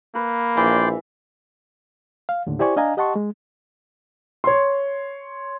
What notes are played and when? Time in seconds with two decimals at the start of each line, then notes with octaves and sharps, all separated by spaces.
0.15 A#3 B4
0.57 A#1 E3 D5 G5 C6
2.29 F5
2.46 D#2 A2 D3
2.59 E4 G4 C5 D5 G#5 C#6
2.76 D4 D#5 F5 G#5 A#5
2.97 G4 D#5 F#5 A5 C6 C#6
3.16 G#3
4.44 C#5 C6